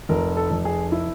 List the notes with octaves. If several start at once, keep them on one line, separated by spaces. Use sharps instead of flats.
F1 A#4
A4
F1
G#4
E4